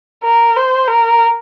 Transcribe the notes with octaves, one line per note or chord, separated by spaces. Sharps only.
A#4
C5
A#4